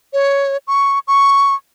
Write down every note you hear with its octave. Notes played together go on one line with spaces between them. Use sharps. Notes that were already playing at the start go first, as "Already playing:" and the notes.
C#5
C#6
C#6